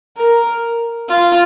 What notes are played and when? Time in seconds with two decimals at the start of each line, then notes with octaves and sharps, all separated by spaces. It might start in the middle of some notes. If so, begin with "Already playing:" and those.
0.17 A#4
1.08 F4